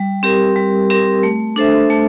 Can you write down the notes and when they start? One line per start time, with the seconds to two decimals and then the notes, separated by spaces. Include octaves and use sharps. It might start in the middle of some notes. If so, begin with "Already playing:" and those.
Already playing: G3
0.23 C4 G4 A#4
0.56 G3
0.90 C4 G4 A#4
1.23 A3
1.56 D4 A4 C5 E5
1.90 A3